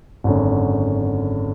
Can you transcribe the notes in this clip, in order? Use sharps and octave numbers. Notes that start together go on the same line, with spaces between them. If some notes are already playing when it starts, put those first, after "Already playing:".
G#1 F#2 D3